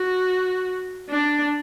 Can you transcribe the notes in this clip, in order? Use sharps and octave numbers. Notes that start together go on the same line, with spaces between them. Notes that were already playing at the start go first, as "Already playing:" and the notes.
Already playing: F#4
D4